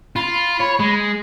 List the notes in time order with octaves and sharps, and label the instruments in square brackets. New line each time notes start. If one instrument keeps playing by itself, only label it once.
[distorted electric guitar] F4 [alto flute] B5
[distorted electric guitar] C#5
G#3